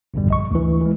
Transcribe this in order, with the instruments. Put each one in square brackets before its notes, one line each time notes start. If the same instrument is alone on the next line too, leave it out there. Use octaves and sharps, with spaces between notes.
[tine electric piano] A1 E2 G2 B2 D3 G3
A#1 D#5 C#6
D2 E3
E3 G#3